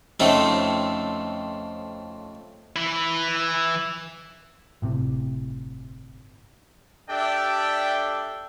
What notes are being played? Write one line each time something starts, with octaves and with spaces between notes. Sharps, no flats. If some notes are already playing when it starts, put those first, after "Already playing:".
F2 A2 C#3 A3 C4 D#4
E3 E4
G1 A2 C3
D4 G4 A4 D5 E5 G5